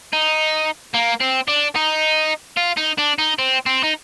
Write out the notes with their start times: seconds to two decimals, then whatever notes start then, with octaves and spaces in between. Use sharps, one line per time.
0.13 D#4
0.94 A#3
1.21 C4
1.48 D4
1.76 D#4
2.57 F4
2.77 D#4
2.98 D4
3.19 D#4
3.39 C4
3.66 C4
3.83 D#4